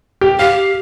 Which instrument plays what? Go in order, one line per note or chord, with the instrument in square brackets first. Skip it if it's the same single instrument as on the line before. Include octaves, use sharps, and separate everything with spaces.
[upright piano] G4
[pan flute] G4 [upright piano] F5